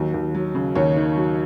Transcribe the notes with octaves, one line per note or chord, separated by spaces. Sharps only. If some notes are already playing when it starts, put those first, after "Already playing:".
Already playing: D#2 F#3
D#2
F#3
C#3
D#2 C#5
D#3
F#3